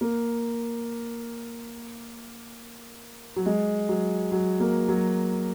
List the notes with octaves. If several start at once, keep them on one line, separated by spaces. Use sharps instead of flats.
A#3
F#3
G#3
F#3
F#3
A#3
F#3